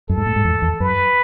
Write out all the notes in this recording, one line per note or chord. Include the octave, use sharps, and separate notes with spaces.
F#2 A4
G#2
A2
G#2
E2
E2
F#2 B4